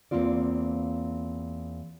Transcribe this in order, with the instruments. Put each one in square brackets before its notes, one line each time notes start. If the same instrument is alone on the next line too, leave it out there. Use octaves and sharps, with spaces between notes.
[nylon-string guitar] E2 D#3 A#3 C4 F4 D5